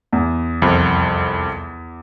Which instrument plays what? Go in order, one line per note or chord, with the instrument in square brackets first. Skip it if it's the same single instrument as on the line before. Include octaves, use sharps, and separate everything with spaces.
[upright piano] E2
[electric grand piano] C2 F2